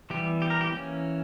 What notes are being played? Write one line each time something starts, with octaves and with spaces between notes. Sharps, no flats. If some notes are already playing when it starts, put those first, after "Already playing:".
E3 G3 B3 G4
G4
A#4
G4
E3 A#3 C#4